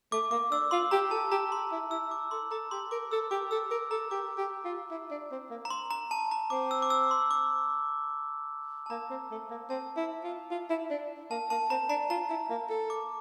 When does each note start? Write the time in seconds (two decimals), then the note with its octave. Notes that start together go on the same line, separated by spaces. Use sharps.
0.12 A3 D6
0.31 A#3 D6
0.51 D4 E6
0.71 F4 C6
0.91 G4 A#5
1.11 A4 A5
1.31 G4 A#5
1.52 C6
1.72 E4
1.91 E4 E6
2.11 D6
2.31 A4 C6
2.51 A4 A#5
2.71 G4 C6
2.91 A#4 D6
3.11 A4 E6
3.31 G4 D6
3.51 A4 E6
3.71 A#4 D6
3.91 A4 A#5
4.11 G4 D6
4.38 G4
4.65 F4
4.91 E4
5.11 D4
5.32 C4
5.50 A#3
5.65 A#5
5.70 C6
5.91 A#5
6.11 A5
6.31 A#5
6.50 C4 D6
6.71 E6
6.82 D6
6.90 E6
7.11 C6
7.31 D6
8.86 A5
8.90 A#3 A#5
9.10 C4
9.31 A3
9.50 A#3
9.70 C4 A5
9.97 E4
10.24 F4
10.51 F4
10.70 E4
10.90 D4
11.31 A#3 A5
11.50 A#3 A5
11.70 C4 A#5
11.89 D4 A#5
12.10 F4 A#5
12.30 E4
12.50 A#3
12.69 A4
12.90 D6